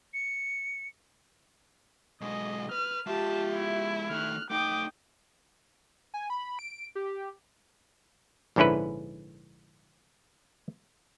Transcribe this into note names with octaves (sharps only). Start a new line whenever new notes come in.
C#7
B1 G#3 D#5
B4 F6
G#3 F4 G4 E5 A5
E4
D#3 A3 F6 F#6
A3 D#4 G5 D6 D#6
G#5
B5
D7
G4
A#1 G#2 D3 C#4 E4 B4